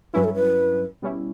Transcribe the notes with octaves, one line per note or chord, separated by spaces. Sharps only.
G2 F#3 C#4 E4 B4
A4
B4
B2 G3 C#4 E4